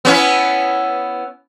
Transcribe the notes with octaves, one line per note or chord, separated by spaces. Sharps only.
B3 C#4 E4